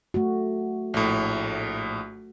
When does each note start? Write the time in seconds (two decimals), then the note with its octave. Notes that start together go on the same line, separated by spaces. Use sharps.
0.14 A3 F#4
0.94 A#1 A2